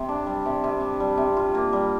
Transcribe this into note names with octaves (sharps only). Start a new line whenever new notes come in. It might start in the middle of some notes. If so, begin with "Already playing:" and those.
Already playing: C3
D4
G3
C3
C3
D4
G3
C3
F4
A#3
G3